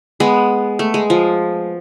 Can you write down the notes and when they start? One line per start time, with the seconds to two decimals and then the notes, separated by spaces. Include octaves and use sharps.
0.20 G#3 B3
0.79 A3
0.94 G#3
1.10 F3